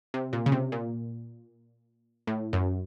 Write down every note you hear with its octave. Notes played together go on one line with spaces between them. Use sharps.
C3
A#2
C#3
C3
A#2
A2
F#2